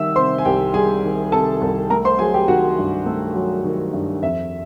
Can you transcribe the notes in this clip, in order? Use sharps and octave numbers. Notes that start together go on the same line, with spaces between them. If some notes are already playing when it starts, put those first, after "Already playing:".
Already playing: D#3 G3 E5 E6
C3 C5 C6
G#5
C2 G4 G5
G3 G#4 G#5
D#3
C3 A4 A5
C2
A3 A#4 A#5
C5 C6
F#3 G#4 G#5
G4 G5
D#3 F#4 F#5
G2
A3
F#3
D#3
G2
F2 E5